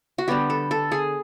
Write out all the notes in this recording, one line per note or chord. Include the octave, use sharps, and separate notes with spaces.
F#4
D3 G3 B3 G4
A4
A4
G#4